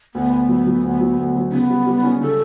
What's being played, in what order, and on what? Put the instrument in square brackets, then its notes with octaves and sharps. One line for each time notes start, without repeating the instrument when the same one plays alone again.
[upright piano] D2 [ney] B3
[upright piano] D2
F#3
F#3
D2
F#3
D2
F#3
[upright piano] C#3 [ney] B3
[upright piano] G3
G3
C#4
[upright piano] C#3 [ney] A4